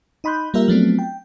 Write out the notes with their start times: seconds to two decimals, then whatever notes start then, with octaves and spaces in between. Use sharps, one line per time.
0.24 D#4 D#5 B5 C6 F#6 G6
0.54 G3 A#3 F4 G4 A#4 E5
0.68 F3 F#3 A3 B3 C4 D4
0.99 G5